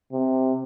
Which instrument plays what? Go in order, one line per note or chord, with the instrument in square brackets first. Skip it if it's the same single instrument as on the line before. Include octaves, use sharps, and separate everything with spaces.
[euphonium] C3